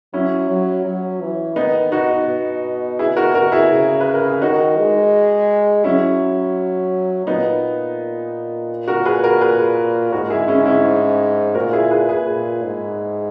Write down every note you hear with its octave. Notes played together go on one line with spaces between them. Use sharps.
F#3 C#4 E4
F#3
F#3
E3
D#3 B3 D#4
B2 D#4 F#4
B2
E4 G#4
F#4 A#4
F#4 A#4
E4 G#4
C#3
B4
A#4
G#4
D#3 D#4 F#4
G#3
F#3 C#4 E4
A#2 B3 D#4
F#4 A#4
G#4 B4
F#4 A#4
G#4 B4
G#2 F#4 A#4
E4 G#4
C#4 E4
C#4 E4
A#2 F#4 A#4
E4 G#4
G#4 B4
G#4 B4
A#2
G#2